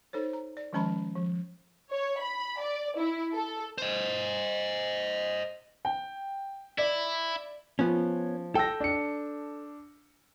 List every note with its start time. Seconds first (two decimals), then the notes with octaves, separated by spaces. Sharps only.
0.13 D#4 A4 C5 C#5
0.33 A#5
0.57 D5
0.73 D#3 F3 G#3 C#4 A#5 B5
1.15 F3
1.90 C#5
2.20 B5
2.62 D5
2.98 E4
3.34 A4
3.78 C5 D#5
5.85 G5
6.78 E4 D5
7.79 F3 B3 C#4
8.55 A4 G5 E6 A#6
8.80 D4 C#7